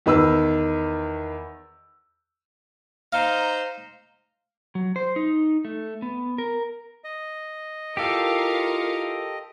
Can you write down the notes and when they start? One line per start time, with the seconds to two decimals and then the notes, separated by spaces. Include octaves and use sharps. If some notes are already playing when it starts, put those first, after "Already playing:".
0.06 E2 D#3 B4 E6
3.13 D#4 C5 F5 A#5
4.75 F#3
4.96 C5
5.16 D#4
5.65 A3
6.02 B3
6.38 A#4
7.04 D#5
7.97 E4 F4 G4 A4 A#4 F5 C#7